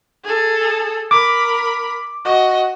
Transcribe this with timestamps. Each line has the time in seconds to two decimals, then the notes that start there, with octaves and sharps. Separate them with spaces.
0.24 G#4 A4
1.11 A#4 B5 D6
2.24 F#4 D#5